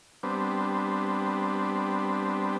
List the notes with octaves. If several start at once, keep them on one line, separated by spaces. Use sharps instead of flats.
G3 B3 C4 D4